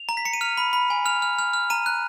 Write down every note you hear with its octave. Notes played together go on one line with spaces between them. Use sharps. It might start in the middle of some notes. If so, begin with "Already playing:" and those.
Already playing: F7
A#5
B6
A#5 C#7
D#7
F6 F7
B5
B5
G#5
F6 F7
F6
F6
F6
A#5 D#7
F#6